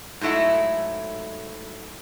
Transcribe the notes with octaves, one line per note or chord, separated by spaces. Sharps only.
G#2 F#3 A3 E4 A4